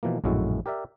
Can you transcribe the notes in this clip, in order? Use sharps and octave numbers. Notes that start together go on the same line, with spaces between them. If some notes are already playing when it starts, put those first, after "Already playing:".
B2 E3 F3 A#3
A#1 F#2 A2 G#3 E4 F#4
G4 A#4 D5 E5